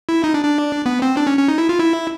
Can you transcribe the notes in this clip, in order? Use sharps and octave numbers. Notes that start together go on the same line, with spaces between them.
E4
D#4
D4
D4
B3
C4
D4
C#4
C#4
D#4
E4
F4
E4